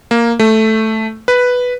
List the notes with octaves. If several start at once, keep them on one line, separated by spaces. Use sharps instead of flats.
A#3
A3
B4